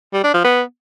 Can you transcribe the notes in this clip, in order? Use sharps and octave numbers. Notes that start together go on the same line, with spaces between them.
G3
D4
F3
B3